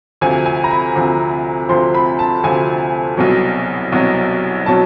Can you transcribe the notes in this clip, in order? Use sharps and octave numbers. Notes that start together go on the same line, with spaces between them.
D2 C3 F3 G#5
G#5
A#5
B5
D2 C3 F3
D2 C3 F3 C6
B5
A5
D2 C3 F3 G#5
C2 B2 F#3
C2 B2 F#3
B2 F#3 A5